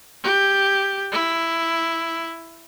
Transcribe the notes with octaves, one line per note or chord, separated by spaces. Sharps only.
G4
E4